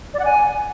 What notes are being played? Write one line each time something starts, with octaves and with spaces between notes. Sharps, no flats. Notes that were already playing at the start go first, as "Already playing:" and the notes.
D5
F#5
G#5